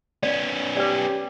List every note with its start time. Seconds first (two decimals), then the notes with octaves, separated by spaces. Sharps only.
0.23 B3 C#4 D5
0.77 G4 B4 D5